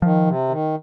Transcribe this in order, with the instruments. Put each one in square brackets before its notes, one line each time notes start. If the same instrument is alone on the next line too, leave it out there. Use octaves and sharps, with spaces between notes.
[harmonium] D#3 [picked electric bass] F3
[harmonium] C3
D#3